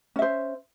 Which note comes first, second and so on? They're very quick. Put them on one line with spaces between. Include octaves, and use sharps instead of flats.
C#4 E5 C5